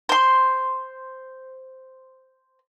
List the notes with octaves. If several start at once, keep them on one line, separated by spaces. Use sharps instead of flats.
C5 C6